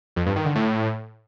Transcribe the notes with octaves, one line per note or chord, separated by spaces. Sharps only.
F2
G2
D#3
D3
A2